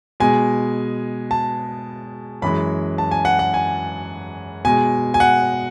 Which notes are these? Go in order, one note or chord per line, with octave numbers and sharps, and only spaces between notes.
B2 G#3 G#5
A5
F#2 E3 G#3 B5
A5
G#5
F#5
F#5
G#5
B2 G#3 G#5
G#5
F#5